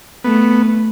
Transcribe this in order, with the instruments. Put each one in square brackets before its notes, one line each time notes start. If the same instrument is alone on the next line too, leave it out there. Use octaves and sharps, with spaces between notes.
[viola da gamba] A3 [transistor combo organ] B3